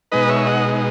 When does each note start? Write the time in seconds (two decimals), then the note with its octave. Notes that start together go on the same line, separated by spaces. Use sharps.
0.12 B2 G#3 D#4 B4 D#5
0.29 C#5 E5
0.47 D#5 F#5